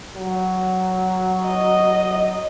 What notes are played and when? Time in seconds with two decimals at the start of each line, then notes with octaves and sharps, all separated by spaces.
0.16 F#3
1.48 D#5